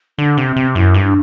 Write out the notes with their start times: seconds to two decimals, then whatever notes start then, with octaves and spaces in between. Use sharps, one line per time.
0.18 D3 D4
0.37 C3
0.47 C4
0.56 C3
0.75 F#2 E4
0.94 G2
1.04 D4